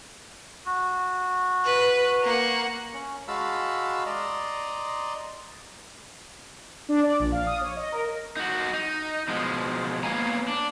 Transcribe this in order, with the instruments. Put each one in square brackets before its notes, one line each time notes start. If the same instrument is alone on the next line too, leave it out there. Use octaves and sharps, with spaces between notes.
[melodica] F#4
[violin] B4
A#3 F#5
[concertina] C#4
G#3 F#4 F5 A5 B5 E6
D5 D#5 A#5 C6
[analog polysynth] D4
D5
A#1
F5
D#6
C#5
D#5
A#4
[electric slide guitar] D#4 F#4
D#4
B2 F3 G#3
A#3 B3 C#5 F5 G#5 A#5
D4